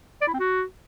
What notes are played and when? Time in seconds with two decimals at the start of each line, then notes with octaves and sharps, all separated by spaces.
0.22 D5
0.28 E4
0.34 C4
0.40 F#4